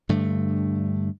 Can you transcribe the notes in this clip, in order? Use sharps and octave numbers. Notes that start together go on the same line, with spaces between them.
G2 D3 A3